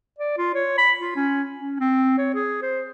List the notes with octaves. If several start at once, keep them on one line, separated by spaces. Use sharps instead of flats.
D5
F4
C#5
B5
F4
C#4
C#4
C4
C#5
G#4
C5